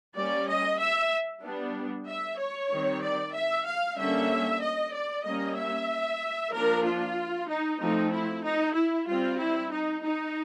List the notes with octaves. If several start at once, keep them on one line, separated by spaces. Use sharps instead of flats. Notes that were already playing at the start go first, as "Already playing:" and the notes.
G3 A#3 C#4 D5
D#5
E5
G3 B3 D4
E5
C#5
D#3 G3 C4
D5
E5
F5
D3 G3 A#3 C#4 E5
D#5
D5
G3 A#3 C#4 D#5
E5
F3 A#3 D4 A#4
F4
D#4
F3 A3 C4 D#4
E4
D#4
E4
G3 C4 F4
E4
D#4
D#4